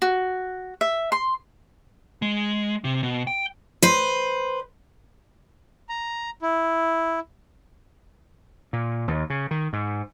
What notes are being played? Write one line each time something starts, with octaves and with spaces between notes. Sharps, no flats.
F#4
E5
C6
G#3
C3
B2
G5
B4 C5
A#5
E4
A#2
D#2
C#3
D#3
G#2